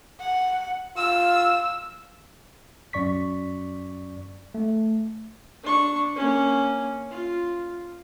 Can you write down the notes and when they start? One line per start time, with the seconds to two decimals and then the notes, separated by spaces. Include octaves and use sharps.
0.21 F#5
0.97 F4 E6
2.93 F#2 D5 C#6 B6
4.54 A3
5.63 D4 C#6
6.16 A#3 C#4
7.10 F4